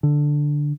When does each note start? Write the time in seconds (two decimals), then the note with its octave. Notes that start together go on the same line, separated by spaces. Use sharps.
0.03 D3